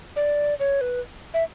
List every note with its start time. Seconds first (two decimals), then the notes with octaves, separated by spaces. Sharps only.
0.16 D5
0.59 C#5
0.81 B4
1.34 E5